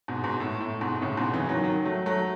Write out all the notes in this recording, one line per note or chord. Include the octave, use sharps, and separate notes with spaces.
G#2 B2
G#2 B2
A2
A2
G#2 B2
A2 C#3
G#2 B2
C#3 E3
D#3 F#3
D#3 F#3
F#3 A3
F#3 A3